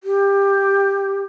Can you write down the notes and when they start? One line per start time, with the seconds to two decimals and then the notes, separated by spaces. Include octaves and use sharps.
0.04 G4